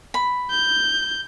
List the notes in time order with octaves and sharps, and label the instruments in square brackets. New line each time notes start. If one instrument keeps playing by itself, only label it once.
[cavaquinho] B5
[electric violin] G6